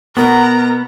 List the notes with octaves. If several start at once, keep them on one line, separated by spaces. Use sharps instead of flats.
B2 B3 A#4 A#5